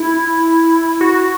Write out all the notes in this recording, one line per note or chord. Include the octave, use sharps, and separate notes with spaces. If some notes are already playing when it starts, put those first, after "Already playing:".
Already playing: E4
F#4